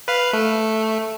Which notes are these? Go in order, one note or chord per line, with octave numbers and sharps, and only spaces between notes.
B4 F5
A3